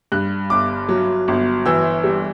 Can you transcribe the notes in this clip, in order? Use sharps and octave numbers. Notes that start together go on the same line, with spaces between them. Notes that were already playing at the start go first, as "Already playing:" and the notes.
G2 F#6
G1 D6
F#3
G1
E3 E6
G3